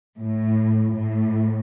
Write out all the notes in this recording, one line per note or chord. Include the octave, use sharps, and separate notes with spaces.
A2
A2